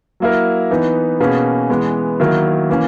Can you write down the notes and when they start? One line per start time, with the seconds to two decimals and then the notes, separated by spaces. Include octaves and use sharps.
0.20 F#3 A#3 E4 A#4
0.71 E3 B3 D#4
1.20 B2 A#3 C#4 G#4 B4
1.70 E3 G#3 B3
2.20 D#3 F#3 A#3 E4 A#4
2.70 E3 A#3 C#4